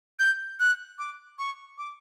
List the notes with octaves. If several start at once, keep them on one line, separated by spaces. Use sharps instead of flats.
G6
F#6
D6
C#6
D6